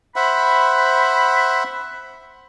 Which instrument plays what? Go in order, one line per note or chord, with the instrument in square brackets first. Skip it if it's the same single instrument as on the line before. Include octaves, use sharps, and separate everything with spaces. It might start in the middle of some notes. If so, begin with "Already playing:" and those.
[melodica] C5 E5 F#5 [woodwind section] B5